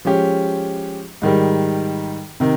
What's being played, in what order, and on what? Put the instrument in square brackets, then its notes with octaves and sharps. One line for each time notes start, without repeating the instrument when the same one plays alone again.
[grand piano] F3 G#3 C#4 G4
G#2 D#3 G3
C3 D#3